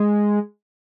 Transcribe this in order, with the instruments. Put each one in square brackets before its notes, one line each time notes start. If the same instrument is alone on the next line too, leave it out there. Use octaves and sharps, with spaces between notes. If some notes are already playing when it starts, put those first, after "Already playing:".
Already playing: [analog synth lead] G#3